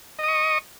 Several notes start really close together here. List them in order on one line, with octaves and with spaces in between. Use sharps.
D#5 D#6 C#6